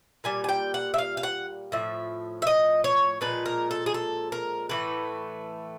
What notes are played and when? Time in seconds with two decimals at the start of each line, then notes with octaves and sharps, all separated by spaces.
0.24 A#2 G3 G#5
0.44 G#5
0.49 G5
0.74 F#5
0.94 E5
0.98 F5
1.17 F5
1.23 F#5
1.72 A2 F3 E5
2.42 E5
2.47 D#5
2.84 C#5
3.21 A#2 F3 G#3 B4
3.46 A#4
3.71 A4
3.86 G#4
3.94 A4
4.32 A#4
4.69 A2 E3 A3 B4